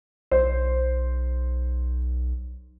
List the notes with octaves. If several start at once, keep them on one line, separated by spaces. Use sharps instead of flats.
B1 C5